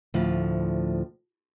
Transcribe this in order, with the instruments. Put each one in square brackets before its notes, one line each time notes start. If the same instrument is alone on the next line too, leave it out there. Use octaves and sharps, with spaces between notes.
[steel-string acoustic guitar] D2 A2 F3